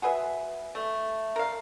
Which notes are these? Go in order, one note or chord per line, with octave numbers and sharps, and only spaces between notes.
F#4 G#4 B4 E5
A3
A#4 F5